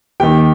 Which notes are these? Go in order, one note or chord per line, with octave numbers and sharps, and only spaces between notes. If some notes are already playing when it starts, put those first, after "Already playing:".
D#2 D#3 G4 G5